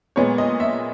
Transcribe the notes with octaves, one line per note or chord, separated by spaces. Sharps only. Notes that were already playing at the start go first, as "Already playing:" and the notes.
A#2 G#3 B3 C#5
D#5
E5